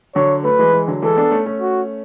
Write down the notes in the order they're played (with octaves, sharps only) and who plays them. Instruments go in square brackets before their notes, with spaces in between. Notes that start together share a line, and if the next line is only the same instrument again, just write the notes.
[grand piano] D3 F#3 [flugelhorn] C#5
[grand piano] F#3 A3 [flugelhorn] B4
[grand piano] E3 G#3
E3 G#3
D3 F#3
[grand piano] E3 G#3 [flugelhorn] A4
[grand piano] B3 D4
A3 C#4
A3 C#4
[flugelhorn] F#4